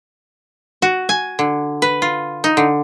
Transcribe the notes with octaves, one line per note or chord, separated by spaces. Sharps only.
F#4
G#5
D3
B4
F4
D#4
D3